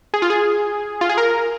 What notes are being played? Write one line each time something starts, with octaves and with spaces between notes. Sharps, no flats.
G#4
F4
G#4
F4
G#4
A#4